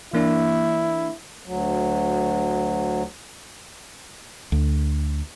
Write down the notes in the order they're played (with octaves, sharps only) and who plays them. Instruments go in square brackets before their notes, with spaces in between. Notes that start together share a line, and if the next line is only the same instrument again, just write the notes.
[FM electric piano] E3 A#3 D4 [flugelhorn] E4
[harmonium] D2 F#3
[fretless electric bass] D2